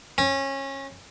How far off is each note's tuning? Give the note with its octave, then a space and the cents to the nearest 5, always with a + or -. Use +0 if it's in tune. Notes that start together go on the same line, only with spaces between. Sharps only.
C#4 -25